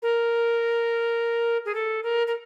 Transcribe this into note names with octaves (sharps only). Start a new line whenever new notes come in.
A#4
G#4
A4
A#4
A#4